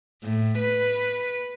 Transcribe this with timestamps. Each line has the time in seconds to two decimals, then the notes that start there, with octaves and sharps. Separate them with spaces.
0.24 A2
0.59 B4